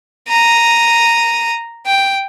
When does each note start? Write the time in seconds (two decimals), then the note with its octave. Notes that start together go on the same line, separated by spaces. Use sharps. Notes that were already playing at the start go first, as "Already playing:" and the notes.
0.29 A#5 D#7
1.87 G5